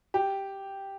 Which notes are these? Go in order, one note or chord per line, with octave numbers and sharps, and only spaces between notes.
G4